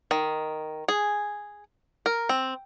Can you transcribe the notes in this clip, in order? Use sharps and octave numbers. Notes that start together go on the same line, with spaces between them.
D#3
G#4
A#4
C4